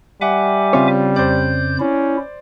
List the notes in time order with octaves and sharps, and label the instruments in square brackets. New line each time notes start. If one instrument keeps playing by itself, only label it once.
[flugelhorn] G3 [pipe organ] E5 G#5 D6 [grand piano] F#5
[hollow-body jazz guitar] C#3 C4 C#5 [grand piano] F4
[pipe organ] F2 G6 [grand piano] C5 D5
[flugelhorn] C#4 [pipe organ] E4